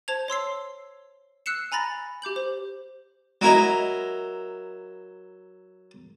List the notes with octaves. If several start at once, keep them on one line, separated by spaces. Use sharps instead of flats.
C5 A5 G#6 F7
C#5 C6 E6 C7
E6 F#6 C7 C#7 E7
G#5 A#5 B5 A6 A#6
G4 D6 G6 F#7
C5
F#3 E4 A#4 D#5